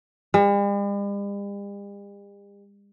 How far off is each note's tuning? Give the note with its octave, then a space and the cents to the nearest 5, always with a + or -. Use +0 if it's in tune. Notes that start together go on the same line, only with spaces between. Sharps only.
G3 +45